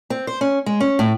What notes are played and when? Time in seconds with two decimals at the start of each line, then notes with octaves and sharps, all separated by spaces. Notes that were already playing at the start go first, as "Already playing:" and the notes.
0.10 C4
0.27 C5
0.41 C#4
0.66 G#3
0.80 C#4
0.99 A2